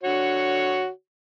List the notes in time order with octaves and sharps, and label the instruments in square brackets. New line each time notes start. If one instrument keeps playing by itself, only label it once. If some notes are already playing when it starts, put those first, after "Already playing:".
[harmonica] D3 F#4 C#5